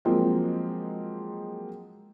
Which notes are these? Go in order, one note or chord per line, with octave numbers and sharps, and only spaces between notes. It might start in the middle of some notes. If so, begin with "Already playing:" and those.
F3 F#3 G#3 A#3 C4